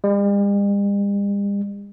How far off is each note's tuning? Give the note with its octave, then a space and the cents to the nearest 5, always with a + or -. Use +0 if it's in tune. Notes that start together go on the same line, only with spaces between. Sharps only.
G3 +45